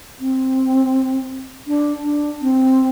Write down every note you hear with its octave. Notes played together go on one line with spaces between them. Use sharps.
C4
D4
D4
C4